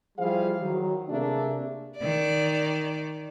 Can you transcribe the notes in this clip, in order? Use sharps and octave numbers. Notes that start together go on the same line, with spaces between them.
F3 G3 E4 G#4 C5 F5
D#3 F#3
C3 A3 A#3 D4 G#4 E5
D#3 D5